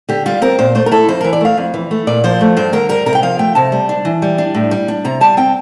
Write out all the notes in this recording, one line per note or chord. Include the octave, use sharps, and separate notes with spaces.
D3 G4
G3 F4
C4 A#4
A#2 C5
A3 C5
A#4
E4 A4
F2 C5
E3 A#4
D5
A3 F5
F2
E3
A3
A#2 D5
F3 C5
A3
G2 C5
D3 A#4
G3 A#4
C3 A#4
G5
F3 F5
A3 G5
C3 A5
G3
D4
E3
G3
D4
A2
G3
D4
C3 A#5
G3 A5
C4 G5